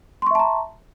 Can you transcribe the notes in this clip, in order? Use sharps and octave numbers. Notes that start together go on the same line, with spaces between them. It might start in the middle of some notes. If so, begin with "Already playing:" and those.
E5 A5 A#5 C6 C#6